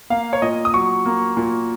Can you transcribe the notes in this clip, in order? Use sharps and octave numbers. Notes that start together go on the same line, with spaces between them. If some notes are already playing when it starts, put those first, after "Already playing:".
A#3 F5
C#5
A#2 D#5
D#6
F#3 C#6
A#3
A#2